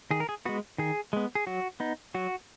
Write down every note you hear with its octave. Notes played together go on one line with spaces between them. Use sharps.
D#3 G#4
A#4
G#4
G#3 B3 F#4
D#3 G#4
G#3 B3
G#4
F#3 F#4
B3 D#4
F#3 F#4